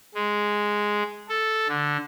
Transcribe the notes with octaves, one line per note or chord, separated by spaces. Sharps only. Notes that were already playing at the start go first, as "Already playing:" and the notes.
G#3
A4
D3